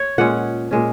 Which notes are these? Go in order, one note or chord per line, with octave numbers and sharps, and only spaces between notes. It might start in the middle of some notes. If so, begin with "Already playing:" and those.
Already playing: C#5
A#2 G#3 C#4 F#5
A#2 G#3 C#4